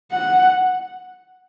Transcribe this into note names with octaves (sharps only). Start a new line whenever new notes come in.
F#5